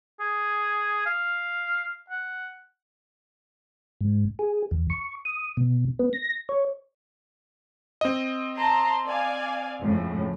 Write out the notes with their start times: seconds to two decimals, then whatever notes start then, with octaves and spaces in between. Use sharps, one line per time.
0.20 G#4
1.06 F5
2.10 F#5
4.01 G#2
4.39 G#4
4.71 E2
4.90 C#6
5.25 D#6
5.57 B2
5.99 B3
6.13 A#6
6.49 C#5
8.01 C4 D#5
8.57 A5 A#5 C6
9.06 D5 F5 G#5
9.81 F2 A2 C#3